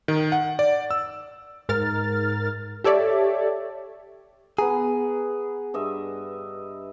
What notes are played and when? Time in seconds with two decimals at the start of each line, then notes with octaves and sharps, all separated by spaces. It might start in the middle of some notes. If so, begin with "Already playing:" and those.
0.08 D#3
0.32 F#5
0.59 D5
0.91 E6
1.69 G#2 A#4 F6 A6
2.84 G4 A4 C#5 D5 E5
4.59 B3 G#4 A#5
5.74 G2 D#5 E5